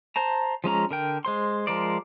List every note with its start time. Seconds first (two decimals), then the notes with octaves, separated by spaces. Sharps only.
0.16 C5 A5 A#5
0.64 F3 G#3 C#4 A#5
0.91 D3 A#4 G5
1.25 G#3 C5 C6
1.67 F3 G#3 A#4 C5 D5